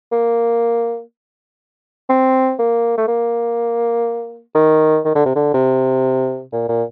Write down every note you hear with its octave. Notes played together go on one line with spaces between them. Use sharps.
A#3
C4
A#3
A3
A#3
D#3
D#3
D3
C3
D3
C3
A#2
A#2